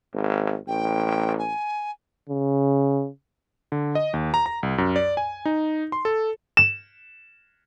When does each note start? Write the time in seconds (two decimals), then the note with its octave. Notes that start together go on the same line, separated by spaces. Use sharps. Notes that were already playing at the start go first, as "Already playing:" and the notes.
0.13 G#1
0.68 A1 G5
1.39 G#5
2.29 C#3
3.72 D3
3.95 D#5
4.13 D#2
4.34 A#5
4.46 A#5
4.63 C2
4.78 F#2
4.96 D5
5.17 G#5
5.45 D#4
5.92 C6
6.05 A4
6.57 E7